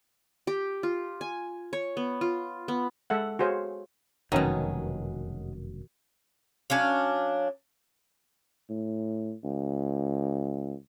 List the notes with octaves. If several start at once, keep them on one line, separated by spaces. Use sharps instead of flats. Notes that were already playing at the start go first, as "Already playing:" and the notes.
G4
F4
G#5
C#5
B3
F4
B3
G#3 A4 E5 F#5
F#4 G#4 C5 C#5 F5
F1 F#2 B2 D#3 F#3 G#3 C#4
F#3 C#4 D4 F5
A2
C#2